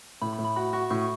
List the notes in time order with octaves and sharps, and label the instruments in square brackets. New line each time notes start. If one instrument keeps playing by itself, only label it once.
[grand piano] A2 [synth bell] B5
[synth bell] B5
[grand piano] A2
[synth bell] B5
[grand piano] F#4 [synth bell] B5
[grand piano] F#4 [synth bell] C#6
[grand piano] A2 [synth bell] C#6